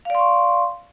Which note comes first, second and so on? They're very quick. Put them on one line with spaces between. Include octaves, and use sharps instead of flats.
F5 D5 C6 C#6